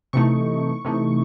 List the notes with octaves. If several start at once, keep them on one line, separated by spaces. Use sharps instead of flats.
C3 E3 A3 D#4 C#6
C3 E3 A3 D#4